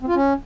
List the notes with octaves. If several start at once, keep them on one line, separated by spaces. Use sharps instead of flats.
C4
F4
C#4